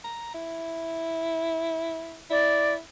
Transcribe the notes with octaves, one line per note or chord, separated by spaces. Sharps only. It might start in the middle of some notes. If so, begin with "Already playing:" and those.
A#5
E4
E4 D5